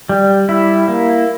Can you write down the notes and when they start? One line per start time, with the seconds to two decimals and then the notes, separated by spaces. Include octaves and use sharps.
0.09 G3
0.49 E4
0.88 A#3